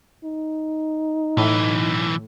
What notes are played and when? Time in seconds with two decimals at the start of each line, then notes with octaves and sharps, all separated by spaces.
0.24 D#4
1.37 B1 A2 E3